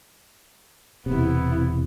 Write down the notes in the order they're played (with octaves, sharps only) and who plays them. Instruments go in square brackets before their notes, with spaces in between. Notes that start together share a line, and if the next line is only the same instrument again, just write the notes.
[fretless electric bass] E1 C3 [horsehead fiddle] B3 E4